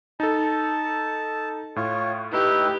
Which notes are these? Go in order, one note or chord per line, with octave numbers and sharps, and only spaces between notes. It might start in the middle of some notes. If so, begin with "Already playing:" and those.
D#4 A4 A5
A2 F4 C#5
D#4 E4 G4 B4